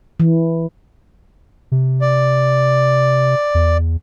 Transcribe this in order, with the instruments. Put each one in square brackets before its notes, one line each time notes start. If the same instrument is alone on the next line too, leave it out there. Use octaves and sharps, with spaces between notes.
[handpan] E3
[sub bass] C3
[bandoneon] D5
[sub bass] E2